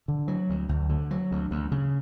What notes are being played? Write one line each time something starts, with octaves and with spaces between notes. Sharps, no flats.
D3
F#3
D2
D2
D3
F#3
D2
D2
C#3